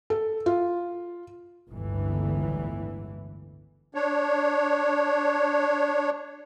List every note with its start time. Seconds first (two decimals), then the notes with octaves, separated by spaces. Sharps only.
0.10 A4
0.46 F4
1.70 G1 C#2 A2 D3 E3
3.94 D4 C#5